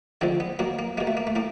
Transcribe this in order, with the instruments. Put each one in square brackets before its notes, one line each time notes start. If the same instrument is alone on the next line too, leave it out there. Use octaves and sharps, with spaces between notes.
[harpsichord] D3 F3 G#3 C4
B3
B2 F#3 A#3
A#3
B2 G#3 A#3
A3
A#3
A3
A2 A#3